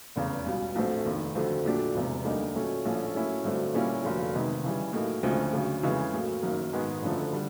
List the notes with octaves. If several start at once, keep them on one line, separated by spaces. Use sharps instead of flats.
F1 E2 C#3
C#2 B2 G3
A#1 A2 F#3 A3 C4
F1 D#2 D#3
F2 D3 F#3 A3 C4
A#2 F#3 A3 D4 G4
E1 E2 C3
D2 D3 G3 A#3 D#4
A#2 F#3 A3 C#4
A#1 A2 F3 A3 C#4
A2 F#3 A#3 C#4 E4
G2 D3 F#3 A3 C4
A#2 G3 A#3 C#4 E4
F1 F2 D3 F#3 A#3
C3 D#3 G#3 B3
C#3 E3 G3
A2 F#3 A#3 D#4
D2 C#3 F3 G#3 C4
D2 C#3 F#3
F2 C#3 E3 G#3
A2 F#3 A#3
F#1 F#2 D#3 F#3 A#3
G#2 D#3 G#3 B3
F#1 F#2 D3 F3 A3
D3 G3